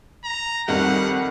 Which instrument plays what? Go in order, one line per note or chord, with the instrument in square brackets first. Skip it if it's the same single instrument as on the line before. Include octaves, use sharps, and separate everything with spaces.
[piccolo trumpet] A#5
[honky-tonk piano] F2 D#3 G3 [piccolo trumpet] F#5